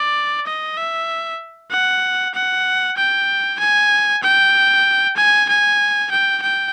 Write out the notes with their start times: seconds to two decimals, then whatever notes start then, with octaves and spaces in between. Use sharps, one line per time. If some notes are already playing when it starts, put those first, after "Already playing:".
Already playing: D5
0.46 D#5
0.77 E5
1.71 F#5
2.34 F#5
2.97 G5
3.59 G#5
4.23 G5
5.16 G#5
5.49 G#5
6.11 G5
6.42 G5